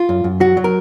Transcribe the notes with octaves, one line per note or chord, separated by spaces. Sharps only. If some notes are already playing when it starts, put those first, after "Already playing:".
Already playing: F4
F#2
F#2
F#3 F#4
F#3
A#4